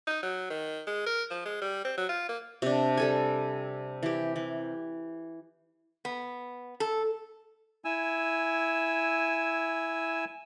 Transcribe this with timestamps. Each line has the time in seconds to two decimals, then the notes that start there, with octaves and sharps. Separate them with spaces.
0.07 D#4
0.23 F#3
0.50 D#3
0.87 G#3
1.06 A#4
1.30 F3
1.45 G#3
1.61 G3
1.85 C4
1.98 F#3
2.09 F4
2.29 A#3
2.62 C3 D4
2.97 G3 A4 G#5
4.03 E3 G4
4.36 E3
6.05 B3
6.80 A4
7.85 E4 G#5 E6